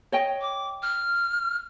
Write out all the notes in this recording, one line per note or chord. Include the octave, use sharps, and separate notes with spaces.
C#5 D#5 G5
D6
F6